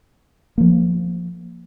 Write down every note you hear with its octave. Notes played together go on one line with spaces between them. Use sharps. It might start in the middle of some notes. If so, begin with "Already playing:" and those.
F3 A#3